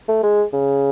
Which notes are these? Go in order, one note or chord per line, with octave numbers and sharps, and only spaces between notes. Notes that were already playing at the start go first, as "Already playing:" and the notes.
A3
G#3
C#3